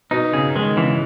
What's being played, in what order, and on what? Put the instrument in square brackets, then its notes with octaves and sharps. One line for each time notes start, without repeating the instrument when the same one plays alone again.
[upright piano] B2 [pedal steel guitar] D#4
[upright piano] C#3 [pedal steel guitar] G#4
[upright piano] D#3 [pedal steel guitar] G#3
[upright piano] C#3 [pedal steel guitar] E3